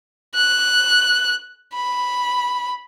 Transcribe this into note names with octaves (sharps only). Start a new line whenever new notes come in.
F#6
B5